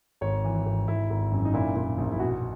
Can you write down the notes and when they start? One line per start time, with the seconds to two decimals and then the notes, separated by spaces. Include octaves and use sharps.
0.21 G#1 C#5
0.44 E3
0.66 G#1
0.88 G#1 E4
1.10 G#1
1.32 F#2
1.45 D#4
1.54 A#2 E4
1.76 A#2
1.98 A#1
2.12 E4
2.20 B2 F#4